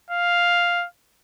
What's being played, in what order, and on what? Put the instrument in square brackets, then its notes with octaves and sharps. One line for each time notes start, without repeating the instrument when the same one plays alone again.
[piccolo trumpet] F5